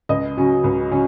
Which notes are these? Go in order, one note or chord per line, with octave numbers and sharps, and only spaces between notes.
C#2 D#5
C#3 F#3 C#4
C#2
C#3 F#3 C#4